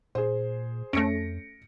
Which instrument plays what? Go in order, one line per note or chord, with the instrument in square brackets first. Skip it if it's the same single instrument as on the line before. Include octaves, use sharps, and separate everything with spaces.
[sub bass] A#2 [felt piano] G#4 C5
[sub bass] F2 [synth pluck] A3 C#4 [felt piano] A#6 C#7 D7